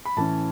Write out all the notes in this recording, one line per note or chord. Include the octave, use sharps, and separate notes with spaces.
B5
A2 E3 C#4 A5